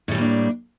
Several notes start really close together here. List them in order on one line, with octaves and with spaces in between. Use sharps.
A2 G3 A3 A#3 D4